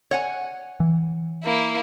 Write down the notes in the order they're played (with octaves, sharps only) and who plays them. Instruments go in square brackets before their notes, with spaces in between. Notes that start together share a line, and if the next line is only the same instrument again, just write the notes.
[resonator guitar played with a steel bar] C#5 F#5 G#5
[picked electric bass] E3
[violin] A#3 E4